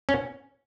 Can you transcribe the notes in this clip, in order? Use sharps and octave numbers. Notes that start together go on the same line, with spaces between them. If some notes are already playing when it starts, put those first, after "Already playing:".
C#4